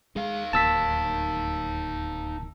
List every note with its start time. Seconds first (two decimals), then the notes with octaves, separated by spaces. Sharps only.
0.16 G#3 D#4 F5
0.53 D1 D#2 A#3 A5 E6 B6